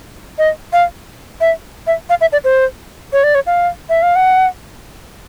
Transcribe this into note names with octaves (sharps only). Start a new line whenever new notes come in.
D#5
F5
E5
E5
F5
E5
D5
C5
C#5
D5
C#5
F5
E5
F5
F#5